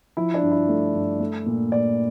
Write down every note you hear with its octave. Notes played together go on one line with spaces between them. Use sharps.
F3 E4
D4
G2
E4
A3
G2
A3
A#2
A#2 D5